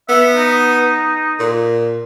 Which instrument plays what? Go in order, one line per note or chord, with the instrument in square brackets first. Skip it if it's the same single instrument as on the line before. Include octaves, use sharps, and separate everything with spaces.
[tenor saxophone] B3 [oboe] E5
[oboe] D#4
[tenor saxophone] A#2